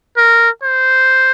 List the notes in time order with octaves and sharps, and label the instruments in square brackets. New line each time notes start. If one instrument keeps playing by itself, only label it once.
[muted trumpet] A#4
C5